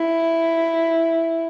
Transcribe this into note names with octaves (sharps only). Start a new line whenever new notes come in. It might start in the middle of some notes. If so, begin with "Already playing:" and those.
Already playing: E4